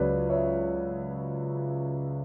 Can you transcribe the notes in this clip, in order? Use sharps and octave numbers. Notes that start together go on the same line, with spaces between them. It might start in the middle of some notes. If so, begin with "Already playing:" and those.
Already playing: C#2 C#3 F#3 B4 C#5 D5
C#5 E5